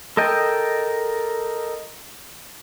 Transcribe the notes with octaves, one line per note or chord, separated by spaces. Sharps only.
A4 A#4 D#5 G5